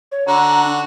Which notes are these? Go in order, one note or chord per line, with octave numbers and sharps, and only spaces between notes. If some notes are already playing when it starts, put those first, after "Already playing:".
C#5
D3 F#4 A#5
D4